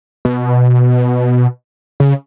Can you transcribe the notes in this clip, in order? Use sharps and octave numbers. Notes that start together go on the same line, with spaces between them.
B2
C#3